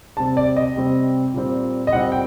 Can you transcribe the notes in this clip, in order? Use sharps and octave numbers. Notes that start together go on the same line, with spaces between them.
C3 G3 C4 A5
D5
D#5
C3 G3 C4
A#2 G3 C4
D#5
A#2 G3 C4 F#5
G5